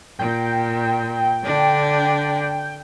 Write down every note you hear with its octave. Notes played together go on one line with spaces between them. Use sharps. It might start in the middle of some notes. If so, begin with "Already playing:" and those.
A#2 G5
D3 D4